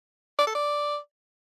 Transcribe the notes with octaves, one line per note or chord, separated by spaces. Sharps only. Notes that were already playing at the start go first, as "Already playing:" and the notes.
D5
A4
D5